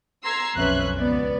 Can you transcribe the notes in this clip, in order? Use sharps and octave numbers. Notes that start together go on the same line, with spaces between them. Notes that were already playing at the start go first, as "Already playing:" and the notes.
A#5 C6 E6 G#6 C7
B1 F2 C#4 B4 E5 F#6
C#2 B3 D5